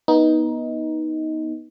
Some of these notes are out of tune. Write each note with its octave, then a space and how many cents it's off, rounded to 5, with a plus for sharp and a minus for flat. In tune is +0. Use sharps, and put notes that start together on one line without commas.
B3 -20 D#4 +10